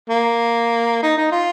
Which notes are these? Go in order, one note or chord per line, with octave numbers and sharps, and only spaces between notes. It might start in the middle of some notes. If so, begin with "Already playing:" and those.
A#3
D#4
D#4
F4